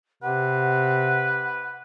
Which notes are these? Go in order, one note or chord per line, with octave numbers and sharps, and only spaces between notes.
C3 B4 F#5